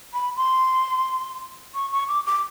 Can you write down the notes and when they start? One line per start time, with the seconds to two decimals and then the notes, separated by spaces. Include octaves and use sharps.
0.14 B5
0.36 C6
1.74 C#6
1.92 C#6
2.08 D6
2.26 D6